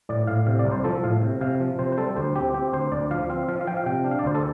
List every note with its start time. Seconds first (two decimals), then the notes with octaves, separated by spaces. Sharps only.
0.09 A2 D5
0.27 A2 F5
0.47 C3 F5
0.59 D5
0.65 C2
0.72 C5
0.84 F3 A4
1.04 A2 F5
1.22 C3
1.41 C3 F5
1.60 F3
1.79 C3 C5
1.92 C5
1.98 G3 A4
2.16 D2 C5
2.35 C4 G4
2.54 C4 G4
2.73 D2 C5
2.92 D2 D5
3.11 F3 F5
3.30 C4 F5
3.48 F3 F5
3.61 F5
3.67 F3 G5
3.77 F5
3.86 C3 G5
4.04 D4
4.11 F5
4.19 D5
4.24 D2 C5
4.35 A4